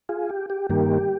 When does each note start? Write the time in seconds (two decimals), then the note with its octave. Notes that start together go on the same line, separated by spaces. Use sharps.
0.09 F4 G#4
0.30 G4
0.50 G4
0.70 G2 D#3 A#3 G4